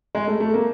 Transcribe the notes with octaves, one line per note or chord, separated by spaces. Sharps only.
G#3
A3
A3
A#3